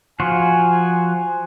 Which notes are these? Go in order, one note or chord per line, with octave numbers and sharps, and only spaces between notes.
F3 F4 F#4 G#5